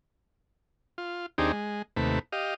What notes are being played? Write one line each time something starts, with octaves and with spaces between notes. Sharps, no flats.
F4
D#2 C4 D4 D#4 G4 G#4
G#3
D#2 C3 A3 B4
G4 D#5 F5